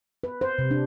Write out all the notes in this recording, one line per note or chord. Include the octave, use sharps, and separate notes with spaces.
B4
C5
C3
D4